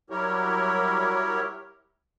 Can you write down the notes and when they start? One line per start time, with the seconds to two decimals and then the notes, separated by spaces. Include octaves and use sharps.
0.10 F#3 G3 E4 G4 A#4 C#5